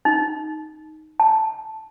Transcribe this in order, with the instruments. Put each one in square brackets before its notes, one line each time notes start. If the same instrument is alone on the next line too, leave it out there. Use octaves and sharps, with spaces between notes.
[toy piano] D#4
A5